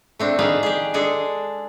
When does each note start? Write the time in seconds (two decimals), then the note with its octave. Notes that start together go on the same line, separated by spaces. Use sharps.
0.19 A3 C4 D4
0.39 D#3 D4 G#4 B4 F5
0.63 G4 G#4
0.94 G#3 D4 G#4 A4